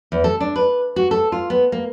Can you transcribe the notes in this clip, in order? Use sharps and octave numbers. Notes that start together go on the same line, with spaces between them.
E2
A4
D4
B4
F#4
A4
F4
B3
A#3